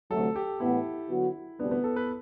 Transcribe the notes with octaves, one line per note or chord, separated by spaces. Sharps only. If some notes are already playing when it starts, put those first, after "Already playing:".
D2 C3 F#3 A3 A4
G4
A2 E3 B3 E4
D3 F#3 B3 F#4
D2 C3 G3 B3 D4
B3
A4
B4